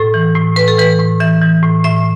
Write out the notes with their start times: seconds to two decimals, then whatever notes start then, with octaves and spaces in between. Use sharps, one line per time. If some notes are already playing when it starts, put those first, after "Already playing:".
Already playing: A2 A4
0.14 E3
0.35 A2
0.56 A2 B4
0.68 A4
0.78 E3 B4
0.99 A2
1.20 E3 E5
1.41 E3
1.63 A2
1.84 A2 E5